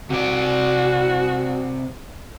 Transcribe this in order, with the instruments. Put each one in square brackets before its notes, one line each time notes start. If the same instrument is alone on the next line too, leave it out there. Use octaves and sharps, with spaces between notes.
[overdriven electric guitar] C3 D5 [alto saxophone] F#4